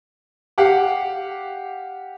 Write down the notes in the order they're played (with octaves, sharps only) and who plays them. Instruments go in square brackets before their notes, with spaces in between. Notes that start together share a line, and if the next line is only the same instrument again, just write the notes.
[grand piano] G4 F5 F#5 D6